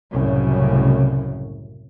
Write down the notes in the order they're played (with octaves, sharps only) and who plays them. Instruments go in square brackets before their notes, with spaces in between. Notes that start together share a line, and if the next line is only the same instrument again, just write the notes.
[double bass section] C2 F#2 A2 C#3